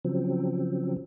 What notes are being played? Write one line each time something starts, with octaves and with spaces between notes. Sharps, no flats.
C#3 F3 F#3 C4